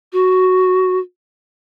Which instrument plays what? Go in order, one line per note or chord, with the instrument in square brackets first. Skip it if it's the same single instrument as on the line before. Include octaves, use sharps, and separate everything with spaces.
[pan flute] F#4